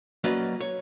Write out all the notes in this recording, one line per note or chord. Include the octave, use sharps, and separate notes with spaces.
F#3 A#3 C#4 B4 D5 D#5
C#5